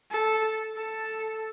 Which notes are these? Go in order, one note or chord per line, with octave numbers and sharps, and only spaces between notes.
A4
A4